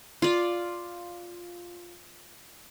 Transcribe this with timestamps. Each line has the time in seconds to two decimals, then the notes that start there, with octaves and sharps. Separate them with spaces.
0.22 F4 D5